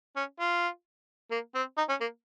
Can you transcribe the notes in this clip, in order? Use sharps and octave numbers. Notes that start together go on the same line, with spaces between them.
C#4
F4
A#3
C4
D#4
C#4
A#3